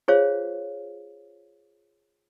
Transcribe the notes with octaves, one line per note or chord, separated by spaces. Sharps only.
F4 G#4 C5 C#5 F5